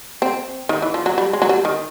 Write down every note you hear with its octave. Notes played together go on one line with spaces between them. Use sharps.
C4
D#3
E3
F3
F#3
G3
G#3
F#3
G3
D#3